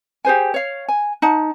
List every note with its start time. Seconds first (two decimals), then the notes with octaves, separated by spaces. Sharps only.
0.25 G4 G#4 C5 G#5
0.54 C#5 F5
0.88 G#5
1.22 D#4 F#5 A5